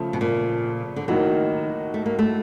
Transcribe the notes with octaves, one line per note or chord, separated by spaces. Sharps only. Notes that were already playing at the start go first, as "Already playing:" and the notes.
Already playing: C#3 F3 A3
B2
A#2
D3
A2 D#3 F#3 A#3 D#4 F#4
A3
A#3
A3